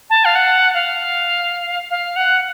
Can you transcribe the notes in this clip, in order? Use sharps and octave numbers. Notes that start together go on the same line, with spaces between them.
A5
F5
F#5
F5
F5
F#5